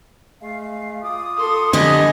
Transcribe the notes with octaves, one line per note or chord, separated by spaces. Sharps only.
G#3 A3 F5
F4 D6 D#6
A4 C6
D3 G3 B3 D#5 G#5